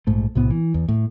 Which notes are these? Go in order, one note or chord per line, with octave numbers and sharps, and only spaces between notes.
A#1 G#2 A3
B1 A2 C3 B3
E3
E2
A2